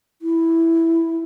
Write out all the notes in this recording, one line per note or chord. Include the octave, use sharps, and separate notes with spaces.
E4